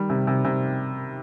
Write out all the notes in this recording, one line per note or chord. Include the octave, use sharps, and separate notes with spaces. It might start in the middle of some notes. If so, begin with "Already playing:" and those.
Already playing: D#3 G3
C3
C3
C3